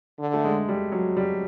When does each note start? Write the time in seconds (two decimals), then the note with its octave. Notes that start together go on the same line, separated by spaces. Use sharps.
0.19 D3
0.34 A3
0.44 G#3
0.69 G3
0.92 F#3
1.17 G3